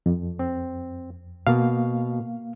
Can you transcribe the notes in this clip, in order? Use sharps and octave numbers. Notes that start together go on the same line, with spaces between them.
F2
C4
B2 A#3 F5